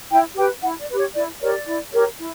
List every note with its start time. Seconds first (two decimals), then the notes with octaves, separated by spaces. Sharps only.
0.11 E4 G5
0.36 G4 B4 G5
0.63 E4 F#5
0.80 D5
0.89 G4 B4
0.98 C#5
1.15 E4 D5
1.41 G4 A#4 C#5 D5
1.67 E4
1.93 G4 A#4 C#5
2.19 E4